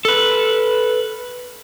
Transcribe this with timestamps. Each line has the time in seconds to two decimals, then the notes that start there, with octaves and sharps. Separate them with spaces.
0.05 A4 B4